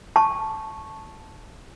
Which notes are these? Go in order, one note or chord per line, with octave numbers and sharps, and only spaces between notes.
A5 C#6